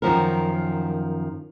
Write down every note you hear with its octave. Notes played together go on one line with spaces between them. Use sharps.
F#2 D#3 F3 A#4